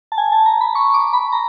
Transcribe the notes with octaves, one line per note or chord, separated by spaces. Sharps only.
A5
G#5
A5
A#5
B5
C#6
D6
B5
A#5